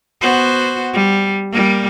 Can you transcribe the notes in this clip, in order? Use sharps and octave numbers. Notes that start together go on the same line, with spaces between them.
B3 F#4 C5
G3
G3 A#3